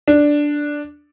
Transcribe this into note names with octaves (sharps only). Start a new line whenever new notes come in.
D4